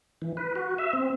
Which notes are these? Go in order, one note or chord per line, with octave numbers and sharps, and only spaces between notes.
E3
B4
F#4
E5
C4